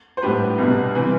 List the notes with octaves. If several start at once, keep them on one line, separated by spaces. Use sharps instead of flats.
C5
A2 G3 B3 D4 G4 B4
C2 B2 B3 D4
C3 E3 G3 C4